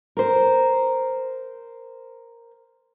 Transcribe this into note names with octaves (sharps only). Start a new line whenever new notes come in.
A#4 C5